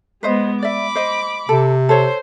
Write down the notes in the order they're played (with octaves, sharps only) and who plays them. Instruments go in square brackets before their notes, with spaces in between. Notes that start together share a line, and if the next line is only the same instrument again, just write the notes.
[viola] G#3 B3 [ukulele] B4 C5 D#5
[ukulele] D5 E5 [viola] B5 D6
[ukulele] C5 D#5
[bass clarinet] C3 [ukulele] A4
[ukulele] A4 C#5 [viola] C5